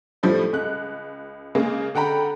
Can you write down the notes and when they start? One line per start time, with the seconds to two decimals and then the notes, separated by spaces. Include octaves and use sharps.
0.23 A2 F3 G3 A3
0.53 C#2 F#6
1.55 C#3 G#3 A#3 G#4
1.95 D3 F#5 G5 A#5 B5